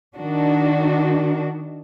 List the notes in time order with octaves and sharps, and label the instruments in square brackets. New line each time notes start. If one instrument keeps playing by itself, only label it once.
[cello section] D#3 D4 F#4